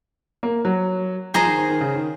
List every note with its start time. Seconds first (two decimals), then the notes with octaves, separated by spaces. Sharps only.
0.43 A#3
0.65 F#3
1.34 F3 G#4 C5 D#5 A#5
1.45 D#3
1.58 D#3
1.69 D#3
1.81 C#3
1.95 D#3